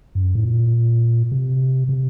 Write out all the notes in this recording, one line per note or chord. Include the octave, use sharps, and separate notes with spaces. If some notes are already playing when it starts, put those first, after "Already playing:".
F#2
A2
A#2
C3
C3